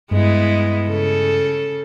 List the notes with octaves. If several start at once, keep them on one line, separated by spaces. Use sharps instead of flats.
G2 G#3 B3 E4
C#3 A4